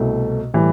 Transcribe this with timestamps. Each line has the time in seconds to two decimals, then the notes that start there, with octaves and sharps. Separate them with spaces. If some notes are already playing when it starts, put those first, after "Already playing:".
Already playing: C2 B2 A3
0.54 A2 E3 G3